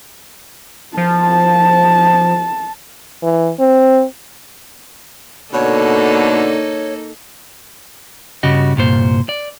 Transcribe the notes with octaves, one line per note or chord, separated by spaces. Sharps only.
F3 A5
E3
C4
B2 D3 A#3 D#4 A4 C#5
G2 C#3 G3 F#4 D#5
C2 G2 A#2 C5
D5